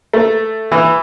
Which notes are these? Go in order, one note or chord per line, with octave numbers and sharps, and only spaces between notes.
A3
E3